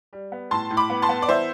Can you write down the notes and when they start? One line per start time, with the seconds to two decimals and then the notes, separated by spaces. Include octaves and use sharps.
0.13 G3
0.32 B3
0.51 A2 A5 C6
0.70 A2
0.77 B5 D6
0.90 B3
1.02 A5 C6
1.09 B3
1.22 D5
1.28 E3 C5 E5